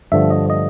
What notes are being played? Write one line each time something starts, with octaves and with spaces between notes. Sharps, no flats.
G2 D3 F3 A3 E5
D#5
D#5